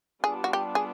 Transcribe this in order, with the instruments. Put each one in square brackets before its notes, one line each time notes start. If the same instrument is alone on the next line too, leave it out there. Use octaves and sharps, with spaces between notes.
[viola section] G3 B3 D4 F4 [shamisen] G#4
[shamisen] F#4
G4
G#4